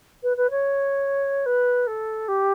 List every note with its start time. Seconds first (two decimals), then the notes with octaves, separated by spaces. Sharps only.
0.23 B4
0.37 B4
0.50 C#5
1.46 B4
1.87 A4
2.28 G4